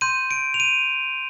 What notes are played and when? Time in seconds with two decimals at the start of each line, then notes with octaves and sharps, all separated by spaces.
0.01 C6 G6 D#7
0.31 D7
0.54 F7
0.60 D#7